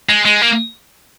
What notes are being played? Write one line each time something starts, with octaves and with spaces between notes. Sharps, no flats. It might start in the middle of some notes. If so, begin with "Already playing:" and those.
G#3
G#3
A#3